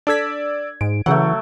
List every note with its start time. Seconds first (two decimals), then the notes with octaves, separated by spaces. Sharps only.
0.07 D4 A4 D5 E6 G#6 B6
0.81 G#2 D7
1.06 C#3 E3 F#3 A3 F#5